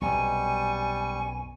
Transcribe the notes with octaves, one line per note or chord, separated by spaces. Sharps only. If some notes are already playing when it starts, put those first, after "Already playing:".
B1 F#2 C3 G3 G#5 C#6